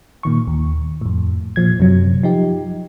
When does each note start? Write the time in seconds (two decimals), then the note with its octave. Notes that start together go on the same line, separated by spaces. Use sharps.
0.23 A#2 D#3 C#6
0.48 D#2
1.01 F2 A2
1.56 A#2 F3 G#6
1.80 F#2 C3 F#3
2.23 F3 D#4 G4